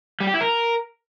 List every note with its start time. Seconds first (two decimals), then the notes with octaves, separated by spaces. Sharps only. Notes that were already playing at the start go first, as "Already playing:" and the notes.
0.20 G3
0.27 G4
0.34 E4
0.41 A#4